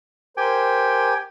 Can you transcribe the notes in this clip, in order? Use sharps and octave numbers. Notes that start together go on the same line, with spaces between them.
G4 A#4 C5 G5 G#5